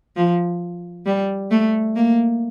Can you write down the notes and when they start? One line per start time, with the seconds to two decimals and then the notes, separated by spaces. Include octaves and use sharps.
0.16 F3
1.06 G3
1.51 A3
1.96 A#3